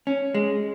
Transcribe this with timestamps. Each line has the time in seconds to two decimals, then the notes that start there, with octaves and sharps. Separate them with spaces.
0.07 C#4
0.34 G#3